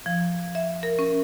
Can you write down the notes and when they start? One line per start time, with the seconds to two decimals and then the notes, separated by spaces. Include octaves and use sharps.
0.06 F3
0.55 E5
0.83 A#4
0.99 C#4